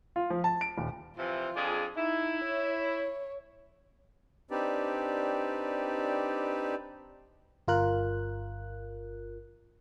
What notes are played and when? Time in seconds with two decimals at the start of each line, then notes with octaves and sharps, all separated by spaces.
0.16 F4
0.30 F3
0.44 A5
0.61 D7
0.78 D#1
1.17 C3 E3 F3 F4
1.56 F2 D4 G#4
1.97 D#4 E4
2.45 C#5
4.51 C4 D4 D#4 G4 B4 D5
7.68 G1 F4 A#4 F#6